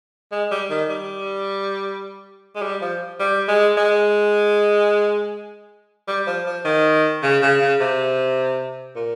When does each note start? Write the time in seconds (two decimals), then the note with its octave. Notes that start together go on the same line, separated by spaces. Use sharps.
0.32 G#3
0.51 G3
0.70 D#3
0.90 G3
2.55 G#3
2.62 G3
2.81 F3
3.20 G3
3.48 G#3
3.77 G#3
6.08 G3
6.27 F3
6.46 F3
6.65 D#3
7.23 C#3
7.42 C#3
7.61 C#3
7.80 C3
8.96 A#2